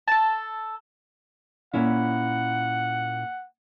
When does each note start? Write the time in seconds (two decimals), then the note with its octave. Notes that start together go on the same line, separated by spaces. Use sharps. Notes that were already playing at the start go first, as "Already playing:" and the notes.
0.07 A4 A5
1.73 A#2 C#4 E4 F#5